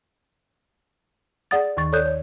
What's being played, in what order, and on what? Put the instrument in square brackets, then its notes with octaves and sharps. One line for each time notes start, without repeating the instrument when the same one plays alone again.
[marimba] G#4 D5 F#5 D#6 A6
D#2 D#3 C#6 A6
A4 C#5 D5 D#6 F#6 G6
C#5